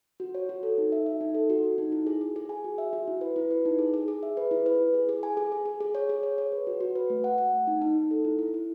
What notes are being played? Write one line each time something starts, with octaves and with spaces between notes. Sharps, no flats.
F#4
C#5
F#4
A4
D#4
E5
E5
D#4
A4
F#4
F#4
D#4
E4
G#4
G#4
G#4
G#5
F#4
E5
F#4
E4
B4
E4
B4
D#4
G#4
G#4
G#4
E5
B4
E4
B4
E4
G#4
G#4
G#5
G#4
G#4
G#4
G#4
C#5
G#4
C#5
C#5
B4
F#4
F#4
B4
A3
F#5
F#5
A3
D#4
D#4
D#4
A4
E4
E4
E4